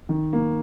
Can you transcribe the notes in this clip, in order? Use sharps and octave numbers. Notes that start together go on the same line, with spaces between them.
D#3
A#3